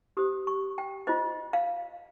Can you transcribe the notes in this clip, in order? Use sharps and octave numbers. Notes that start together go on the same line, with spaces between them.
G4 C5 D#6
C#6
G5
F4 C5 D#5
F5